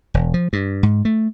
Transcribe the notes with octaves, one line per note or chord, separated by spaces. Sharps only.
E1
F3
G2
G#2
A3